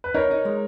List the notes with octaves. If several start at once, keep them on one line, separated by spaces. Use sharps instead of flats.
B4
D#4 A#4 C#5
D#4
G#3